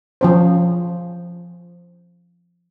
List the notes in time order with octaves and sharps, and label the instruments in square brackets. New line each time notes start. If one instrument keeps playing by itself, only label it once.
[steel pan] F3 C#4 C5